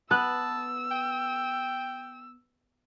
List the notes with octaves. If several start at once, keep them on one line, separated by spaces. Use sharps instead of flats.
B3 A5 E6 F#6
G5